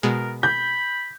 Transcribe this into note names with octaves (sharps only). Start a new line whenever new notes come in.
B2 G#3 A#4
B5 G6